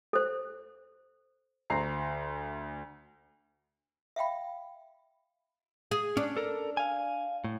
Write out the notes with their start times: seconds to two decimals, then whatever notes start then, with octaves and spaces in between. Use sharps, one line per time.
0.13 A4 C5
1.70 D2 A#5 C7
4.16 E5 F5 G5 B5
5.91 G#4
6.17 C#4 D4
6.37 A4 A#4
6.77 F5 G#5
7.44 A2